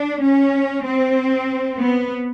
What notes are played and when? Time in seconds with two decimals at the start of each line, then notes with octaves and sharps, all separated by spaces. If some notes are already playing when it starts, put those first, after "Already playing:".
Already playing: D4
0.23 C#4
0.85 C4
1.79 B3